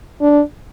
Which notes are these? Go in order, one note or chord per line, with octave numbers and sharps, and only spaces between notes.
D4